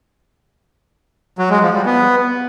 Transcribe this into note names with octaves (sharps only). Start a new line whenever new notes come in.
F#3
G#3
F3
G3
B3